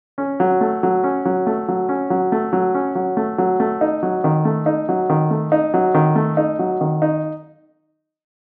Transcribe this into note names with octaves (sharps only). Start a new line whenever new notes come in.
C#4
F#3
A3
F#3
C#4
F#3
A3
F#3
C#4
F#3
A3
F#3
C#4
F#3
A3
F#3
A3
D#4
F#3
D#3
A3
D#4
F#3
D#3
A3
D#4
F#3
D#3
A3
D#4
F#3
D#3
D#4